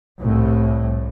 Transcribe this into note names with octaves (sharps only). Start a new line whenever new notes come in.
C2 A2